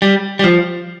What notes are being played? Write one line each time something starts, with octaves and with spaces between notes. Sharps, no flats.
G3
G3
F3